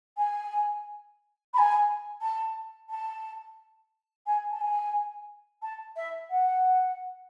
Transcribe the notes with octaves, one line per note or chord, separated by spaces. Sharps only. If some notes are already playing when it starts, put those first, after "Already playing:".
G#5
B5
G#5
A5
A5
G#5
A5
G#5
A5
E5
F#5